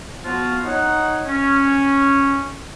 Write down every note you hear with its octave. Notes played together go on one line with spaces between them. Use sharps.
F3 B3 F4 F#4
D#4 C#5 F#5
C#4